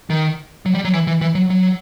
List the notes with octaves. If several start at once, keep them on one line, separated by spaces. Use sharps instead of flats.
D#3
F#3
G3
F#3
E3
E3
E3
F#3
F#3